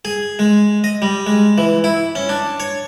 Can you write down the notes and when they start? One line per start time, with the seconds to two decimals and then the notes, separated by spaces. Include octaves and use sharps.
0.05 G#4
0.39 G#3
0.84 D#5
1.02 G3
1.27 G#3
1.58 E3
1.84 E4
2.15 C#4
2.29 D4
2.60 C#5